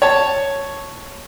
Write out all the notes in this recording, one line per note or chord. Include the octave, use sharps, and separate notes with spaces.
C#5 A5